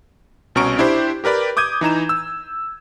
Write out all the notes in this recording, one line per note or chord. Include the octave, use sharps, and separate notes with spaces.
C2 B2 C#4 A#5 C#6 D7
D4 E4 G4 C5
G4 A#4 B4 D5 B5
D6 D#6 G6 G#6 D#7
E3 D#4 A#5 E7
E6